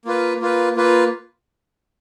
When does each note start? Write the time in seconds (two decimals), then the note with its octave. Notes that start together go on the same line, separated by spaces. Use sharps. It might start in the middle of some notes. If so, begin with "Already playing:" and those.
0.05 A#3 F4 B4
0.40 A#3 F4 B4
0.76 A#3 F4 B4